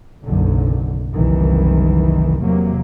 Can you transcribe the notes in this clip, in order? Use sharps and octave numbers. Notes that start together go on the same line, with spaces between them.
F#1 B1 F#2 D3
F#1 C2 D#3 E3
E2 C3 F#3 A#3